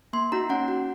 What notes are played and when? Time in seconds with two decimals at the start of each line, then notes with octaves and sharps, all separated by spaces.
0.13 A#3 C6
0.32 D#4 F#4 A#5
0.50 C#4 F#5
0.68 F#4